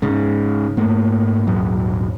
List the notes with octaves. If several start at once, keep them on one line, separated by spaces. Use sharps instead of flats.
G#2 C#3
G#2 A3 A#3
D#1 G#1 F#3